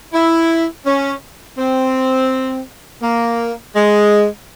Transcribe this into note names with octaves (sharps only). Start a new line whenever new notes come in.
E4
C#4
C4
A#3
G#3